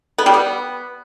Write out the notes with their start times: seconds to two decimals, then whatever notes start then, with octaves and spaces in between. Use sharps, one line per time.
0.18 B3
0.26 G3
0.34 B3